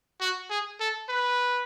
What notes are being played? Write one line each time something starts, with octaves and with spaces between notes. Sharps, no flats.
F#4
G#4
A4
B4